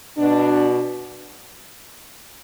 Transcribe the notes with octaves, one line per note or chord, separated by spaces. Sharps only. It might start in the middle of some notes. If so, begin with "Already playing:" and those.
B2 D4